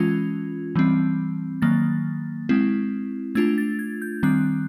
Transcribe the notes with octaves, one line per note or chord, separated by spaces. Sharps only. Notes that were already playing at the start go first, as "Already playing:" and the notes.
Already playing: E3 G#3 C#4 F4 G#6
E3 G3 C4
D#3 F#3 A#3 A6
G#3 C4 E4
A3 D4 F4 G#6
A6
G#6
G6
D#3 G3 C4 F#6